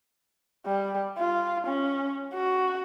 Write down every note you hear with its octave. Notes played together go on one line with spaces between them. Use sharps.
G3
F4
C#4
F#4